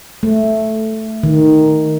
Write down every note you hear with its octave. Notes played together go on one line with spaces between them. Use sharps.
A3
D#3